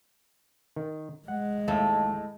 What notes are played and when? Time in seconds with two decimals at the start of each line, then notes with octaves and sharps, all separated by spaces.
0.76 D#3
1.28 G#3 F#5
1.68 D#2 A2 A3 F5